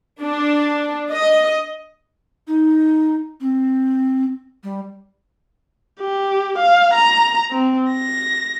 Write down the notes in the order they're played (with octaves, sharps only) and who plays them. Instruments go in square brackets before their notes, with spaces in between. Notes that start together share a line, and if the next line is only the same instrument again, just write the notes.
[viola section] D4
D#5
[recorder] D#4
C4
G3
[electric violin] G4
F5
A#5
C4
A#6